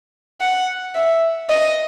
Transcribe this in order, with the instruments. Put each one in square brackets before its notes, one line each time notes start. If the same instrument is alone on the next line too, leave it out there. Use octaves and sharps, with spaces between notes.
[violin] F#5
E5
D#5